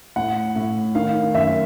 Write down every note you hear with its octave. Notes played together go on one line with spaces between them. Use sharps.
A2 F#5
A2
D#3 F5
F#2 E5